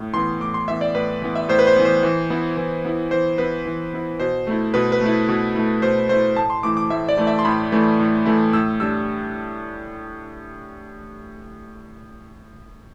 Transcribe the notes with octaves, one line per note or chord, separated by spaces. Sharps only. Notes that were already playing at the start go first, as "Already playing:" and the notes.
Already playing: A2
E3 B3 C6
A2 D6
C6
E3 B3 E5
D5
A2 B4
E3 B3
E5
A2 C5
B4
C5
E3 B3
C5
E3
B3 E4
E3
B3 E4
E3 C5
B3 E4 B4
E3
B3 E4
B2 C5
A3 E4
B2 B4
B4
A3 E4
B2
A3 E4
B2 C5
A3 E4 C5
A2 A5
C6
E3 A3 E4 D6
D6
A2 E5
D5
E3 A3 E4
E5
C6
A2 B5
E3 A3 E4
A2
E3 A3 E4
A2 E6
G3 D4 E6